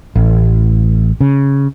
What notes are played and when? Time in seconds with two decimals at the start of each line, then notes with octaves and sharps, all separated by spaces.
0.16 A1
1.21 C#3